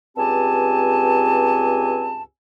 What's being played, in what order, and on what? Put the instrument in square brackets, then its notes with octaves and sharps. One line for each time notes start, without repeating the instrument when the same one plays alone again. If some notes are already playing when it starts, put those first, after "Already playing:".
[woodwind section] C#2 G2 C4 G4 G#5 A5